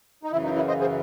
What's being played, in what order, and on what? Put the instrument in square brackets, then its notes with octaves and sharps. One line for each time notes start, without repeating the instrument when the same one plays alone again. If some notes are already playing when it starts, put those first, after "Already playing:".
[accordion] D#4
F#2 C#3 E3 E4
D#4
E4
C5 D#5
G#4 C5